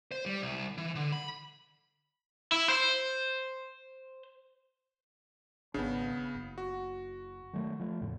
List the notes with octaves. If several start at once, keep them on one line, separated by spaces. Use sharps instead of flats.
C5
G3
C2
E3
D3
B5
E4
C5
G#1 C#3 B3 D4
F#1
F#4
D#3 F#3 A3
F3 A3
E2 A2 C#3